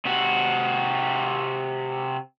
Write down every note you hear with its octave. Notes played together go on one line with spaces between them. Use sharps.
C3 F#4